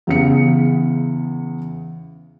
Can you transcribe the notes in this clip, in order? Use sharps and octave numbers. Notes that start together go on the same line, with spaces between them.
E2 C#3 C#7